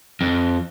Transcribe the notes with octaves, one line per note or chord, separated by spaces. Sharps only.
F2